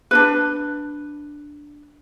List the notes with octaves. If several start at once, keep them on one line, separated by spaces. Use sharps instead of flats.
D4 D#4 B4